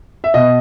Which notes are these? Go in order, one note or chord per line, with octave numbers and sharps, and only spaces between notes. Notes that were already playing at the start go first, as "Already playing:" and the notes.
E5
B2 D#5